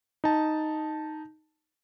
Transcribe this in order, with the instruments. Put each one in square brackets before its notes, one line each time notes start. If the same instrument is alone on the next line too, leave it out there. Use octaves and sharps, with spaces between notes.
[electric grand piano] D#4 A5